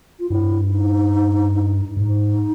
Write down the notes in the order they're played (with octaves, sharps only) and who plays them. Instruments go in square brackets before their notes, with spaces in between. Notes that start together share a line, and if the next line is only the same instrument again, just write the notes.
[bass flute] F4
[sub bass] G2 [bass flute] E4
[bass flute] D#4
[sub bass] G#2 [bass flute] D#4